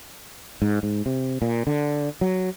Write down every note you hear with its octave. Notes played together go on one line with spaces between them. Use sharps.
G#2
G#2
C3
A#2
D3
F#3